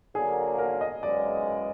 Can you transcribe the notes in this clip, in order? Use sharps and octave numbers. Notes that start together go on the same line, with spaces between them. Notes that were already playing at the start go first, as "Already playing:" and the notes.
D3 F#3 A#3 G#4
A#4
D#5
F#2 C#3 E3 G#3 D5